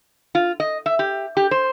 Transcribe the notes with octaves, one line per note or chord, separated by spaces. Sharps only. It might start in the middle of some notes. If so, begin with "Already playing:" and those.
F4
D#5
E5
G4
G4
C5